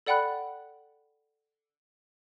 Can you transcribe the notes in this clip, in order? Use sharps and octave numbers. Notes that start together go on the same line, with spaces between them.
A4 D5 F#5 G5 B5 F#6